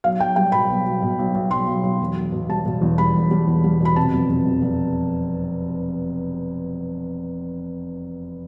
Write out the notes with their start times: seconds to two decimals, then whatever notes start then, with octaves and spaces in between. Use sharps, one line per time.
0.04 B1 F5
0.20 B1 G5
0.36 G3 G5
0.52 B2 B5
0.70 B1
0.86 B1
1.02 B2
1.19 B1
1.35 B1
1.51 B1 C6
1.67 B1
1.83 B1
2.00 E1
2.17 E1
2.32 B2
2.49 G3 A5
2.66 B2
2.82 E2
2.98 G3 B5
3.14 E1
3.31 G3
3.47 E2
3.64 G3
3.80 B2
3.85 B5
3.96 C3 A5
4.14 F1
4.30 C3
4.46 F1
4.62 F1